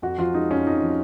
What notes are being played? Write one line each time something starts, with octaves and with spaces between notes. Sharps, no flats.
F2 F#4
F3 F4
G#3 D#4
F2 C#4
F2 D#4
F3